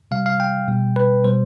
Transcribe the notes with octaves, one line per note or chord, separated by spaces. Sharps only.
C3 G3 F5
F5
G5
B2 G3
B4
B2 G3 C5